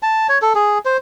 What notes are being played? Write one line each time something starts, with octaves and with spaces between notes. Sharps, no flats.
A5
C#5
A4
G#4
C5